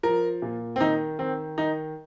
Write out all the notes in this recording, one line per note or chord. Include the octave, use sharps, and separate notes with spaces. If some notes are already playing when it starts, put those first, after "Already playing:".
F3 A#4
A#2
C4
D#3 D#4
D#3 C4
D#3 D#4